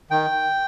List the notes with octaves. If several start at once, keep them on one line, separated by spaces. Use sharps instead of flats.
D#3 G5